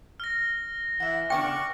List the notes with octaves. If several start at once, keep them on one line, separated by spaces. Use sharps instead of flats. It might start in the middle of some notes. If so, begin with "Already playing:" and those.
F6 A#6
E3 E5 F#5
C#3 B3 D4 D5 G5 C#6